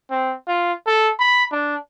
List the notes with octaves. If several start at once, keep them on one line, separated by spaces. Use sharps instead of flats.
C4
F4
A4
B5
D4